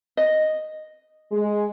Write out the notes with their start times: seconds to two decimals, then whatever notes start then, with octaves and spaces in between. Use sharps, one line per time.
0.17 D#5
1.32 G#3